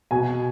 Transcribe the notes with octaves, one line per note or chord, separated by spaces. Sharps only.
B2 G#5